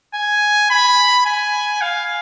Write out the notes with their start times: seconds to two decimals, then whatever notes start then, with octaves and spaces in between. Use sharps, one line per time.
0.14 G#5
0.70 B5
1.26 G#5
1.81 F5